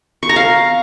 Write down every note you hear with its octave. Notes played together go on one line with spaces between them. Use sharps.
C#6
A#5
F5